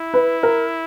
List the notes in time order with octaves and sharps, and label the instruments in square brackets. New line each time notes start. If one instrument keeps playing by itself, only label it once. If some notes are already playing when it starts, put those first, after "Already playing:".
Already playing: [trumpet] E4
[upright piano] B4
A#4